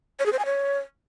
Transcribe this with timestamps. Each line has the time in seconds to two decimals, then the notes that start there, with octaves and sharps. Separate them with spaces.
0.19 C#5
0.26 G#4
0.32 C5
0.39 G#5
0.45 C#5